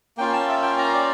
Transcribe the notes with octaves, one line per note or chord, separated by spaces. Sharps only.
A#3 C#4 F4 G5
A5
E5
G5
A#5
D5